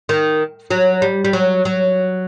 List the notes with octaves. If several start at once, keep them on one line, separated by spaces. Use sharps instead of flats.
D#3
F#3
G3
G3
F#3
F#3